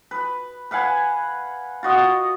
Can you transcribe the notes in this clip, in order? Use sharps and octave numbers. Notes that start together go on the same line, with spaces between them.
B4
B4 F5 F#5 G#5
F4 F#4 D#5